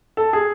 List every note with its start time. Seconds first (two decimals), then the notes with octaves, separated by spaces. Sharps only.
0.17 A4
0.33 G#4